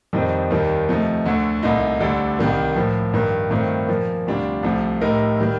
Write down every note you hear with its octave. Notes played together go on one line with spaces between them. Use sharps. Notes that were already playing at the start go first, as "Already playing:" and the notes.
F2 D#3 G3 C4 D#4
D#2 D#3 G3 A#3 D#4
C3 F3 A3 D#4
D2 D3 A3
C2 A#2 A3 D#4
D2 D3 G3 D4 A4
C2 C3 D#3 G3 A#3
A2 F3 A#3
G2 D#3 A#3
G2 D#3 A3 C4 F4
A#2 F3 A#3
D2 C3 G3 D4 F4
C2 C3 F3 A3
A2 A3 D#4 G4 A#4
D#3 G3 A#3